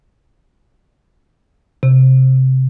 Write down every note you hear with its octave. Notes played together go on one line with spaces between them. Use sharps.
C3